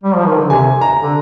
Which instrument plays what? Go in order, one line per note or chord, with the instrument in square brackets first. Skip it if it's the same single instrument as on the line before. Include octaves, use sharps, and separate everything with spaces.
[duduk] G3
F3
D#3
D3
[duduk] C3 [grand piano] G#5
[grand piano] A#5
[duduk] D3